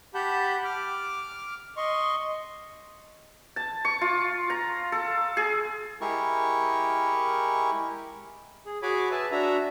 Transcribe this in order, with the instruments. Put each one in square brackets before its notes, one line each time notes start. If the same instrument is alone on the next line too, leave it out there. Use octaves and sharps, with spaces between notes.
[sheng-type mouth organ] G4 F#5 A5 B5 G6
D6 F6
D#5 C6 C#6
[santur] A5
C#6
F4
A#5
A4
G#4
[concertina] G#3 E4 G4 A#4 C#6
[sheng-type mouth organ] G#4
F#4 G#4 C#5 G#5 B5 D6
B4 E5 G#5 A5
D4 F#4 E5 A#5